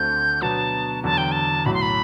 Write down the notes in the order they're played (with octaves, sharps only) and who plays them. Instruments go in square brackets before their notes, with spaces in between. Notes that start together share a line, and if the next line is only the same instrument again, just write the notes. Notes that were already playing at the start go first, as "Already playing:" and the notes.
Already playing: [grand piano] D2 D3 A3 C4 [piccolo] G6
[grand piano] B2 F#3 B3 D4 [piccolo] A5
[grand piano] E2 D3 F#3 [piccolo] A5
[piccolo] G5
A5
[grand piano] B1 A2 F#3 [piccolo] B5
[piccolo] C6
B5